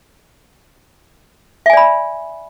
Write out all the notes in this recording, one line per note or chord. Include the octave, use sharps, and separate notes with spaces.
D5 E5 G#5 B5